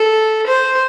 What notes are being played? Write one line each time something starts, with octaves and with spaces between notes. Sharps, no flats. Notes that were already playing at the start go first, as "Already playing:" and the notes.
Already playing: A4
C5